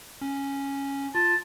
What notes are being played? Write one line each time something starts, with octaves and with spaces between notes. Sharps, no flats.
C#4
F4 A5